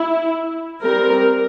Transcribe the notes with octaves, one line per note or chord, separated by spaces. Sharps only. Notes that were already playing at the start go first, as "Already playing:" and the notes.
Already playing: E4
G3 C4 A#4